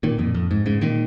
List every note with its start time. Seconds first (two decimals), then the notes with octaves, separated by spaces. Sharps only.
0.03 A#2 D#3
0.18 F2 A#2
0.34 F2
0.51 G#2
0.66 G#2 C#3
0.81 A#2 D#3